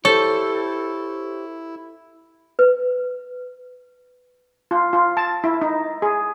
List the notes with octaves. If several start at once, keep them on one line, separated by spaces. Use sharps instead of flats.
E4 G4 A4 C5 C#5
B4
F4
F4
A5
E4
D#4
G#4